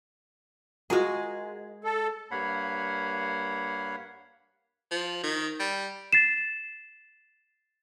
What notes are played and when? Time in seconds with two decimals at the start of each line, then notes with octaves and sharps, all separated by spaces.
0.90 G#3 F4 F#4 G#4 A#4
1.84 A4
2.31 G2 A#3 C#5 F5 F#5 B5
4.91 F3
5.23 D#3
5.60 G3
6.13 A6 C7 E7